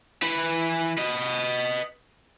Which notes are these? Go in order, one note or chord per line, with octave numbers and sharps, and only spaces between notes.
E3 B4
B4 D#5